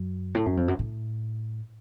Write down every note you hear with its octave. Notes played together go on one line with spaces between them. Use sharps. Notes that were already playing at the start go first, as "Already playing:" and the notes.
Already playing: F#2
A2
F#2
F2
F#2
A2